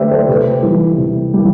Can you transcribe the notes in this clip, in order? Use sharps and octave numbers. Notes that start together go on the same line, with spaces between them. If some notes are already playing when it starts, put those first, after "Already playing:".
Already playing: D3 A3 G4 B4 C5 D5 E5
A4 C5
C3 G4 B4
E3 G3
C3
E3 G3